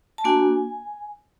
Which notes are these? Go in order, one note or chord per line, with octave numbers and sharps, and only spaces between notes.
A5
A#3 D4 F#4 G#5